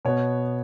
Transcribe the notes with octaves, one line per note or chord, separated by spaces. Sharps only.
B2 B3 C#5